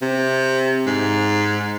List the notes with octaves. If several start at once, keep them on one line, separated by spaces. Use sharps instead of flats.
C3
G#2